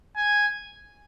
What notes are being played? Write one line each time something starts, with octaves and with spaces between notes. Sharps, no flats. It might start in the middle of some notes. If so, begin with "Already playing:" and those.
G#5